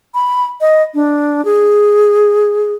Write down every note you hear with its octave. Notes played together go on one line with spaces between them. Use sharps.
B5
D#5
D4
G#4